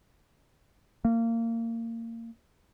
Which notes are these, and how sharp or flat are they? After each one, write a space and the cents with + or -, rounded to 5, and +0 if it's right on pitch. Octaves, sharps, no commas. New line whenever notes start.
A#3 -25